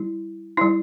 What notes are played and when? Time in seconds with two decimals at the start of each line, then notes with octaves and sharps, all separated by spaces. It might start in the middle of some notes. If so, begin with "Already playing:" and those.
Already playing: G3 E4
0.57 G3 E4